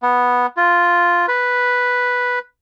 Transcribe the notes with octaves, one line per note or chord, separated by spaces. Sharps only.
B3
F4
B4